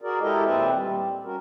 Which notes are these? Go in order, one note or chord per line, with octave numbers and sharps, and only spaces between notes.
F#4 G#4 A#4 D5
G#3 E4 G4 A4 A#4 D#5
D#2 A#2 C4 B4 D5 E5
G3
C#4 F#4 A#4